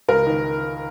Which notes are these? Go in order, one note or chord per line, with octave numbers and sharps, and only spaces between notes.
C#2 A#4
D#3